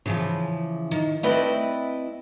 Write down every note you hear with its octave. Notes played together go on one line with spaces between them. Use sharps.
C#3 E3 F3
D#3
A3 C4 E4 B4 D5 D#5